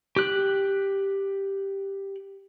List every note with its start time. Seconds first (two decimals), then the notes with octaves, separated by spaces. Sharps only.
0.16 G4 F#6